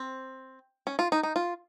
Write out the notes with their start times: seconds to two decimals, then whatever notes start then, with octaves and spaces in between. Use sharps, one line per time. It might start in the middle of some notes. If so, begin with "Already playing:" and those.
Already playing: C4
0.87 C#4
0.99 F4
1.12 D#4
1.23 D#4
1.36 F4